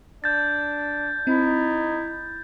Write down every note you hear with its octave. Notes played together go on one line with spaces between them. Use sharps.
D4 G6 A6
C4 D#4 E4